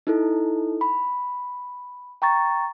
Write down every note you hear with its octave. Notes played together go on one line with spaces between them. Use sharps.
D#4 E4 A4
B5
G5 A#5 C#6 A6